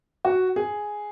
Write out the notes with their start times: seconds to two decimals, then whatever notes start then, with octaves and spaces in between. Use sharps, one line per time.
0.25 F#4
0.56 G#4